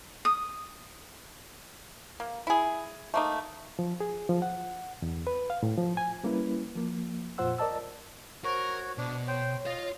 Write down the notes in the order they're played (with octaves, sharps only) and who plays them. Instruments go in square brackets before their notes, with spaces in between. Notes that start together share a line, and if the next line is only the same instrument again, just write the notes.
[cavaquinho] D#6
[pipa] A#3
E4 G#4
A3 A#3 D#4
[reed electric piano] F3
G#4
F3
F#5
E2
B4
F5
A2
F3
G#5
G3 A#3 C#4 E4 B4
F3 A#3
F2 A#2 F4 C5 F#5 E6
A#4 D5 D#5 A5 E6
[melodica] F#4 C#5 [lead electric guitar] A#4 [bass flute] C5
[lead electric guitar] B2 [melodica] D4
[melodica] C5 G5 [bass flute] C#5
[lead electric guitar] F4 F5 [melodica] D#5